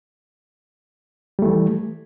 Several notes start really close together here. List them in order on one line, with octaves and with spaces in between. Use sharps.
G3 A3 E3